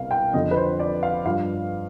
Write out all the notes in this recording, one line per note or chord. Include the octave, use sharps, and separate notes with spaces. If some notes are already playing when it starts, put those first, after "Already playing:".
Already playing: C2 B2 F5
G5
F2 D3 F3 D#5
B4
C5
D5
F5
G2 F3 F5